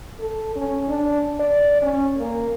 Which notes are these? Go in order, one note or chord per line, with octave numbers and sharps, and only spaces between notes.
A4
C#4
D4
D5
C#4
A#3